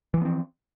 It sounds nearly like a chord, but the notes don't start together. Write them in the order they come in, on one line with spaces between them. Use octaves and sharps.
E3 F3 B3 C4